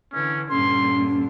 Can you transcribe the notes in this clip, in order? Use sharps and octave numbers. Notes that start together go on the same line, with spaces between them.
D3 E3 C#4
G2 A#2 D3 C#4 C6